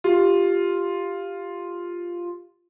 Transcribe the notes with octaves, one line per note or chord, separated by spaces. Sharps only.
F4 G4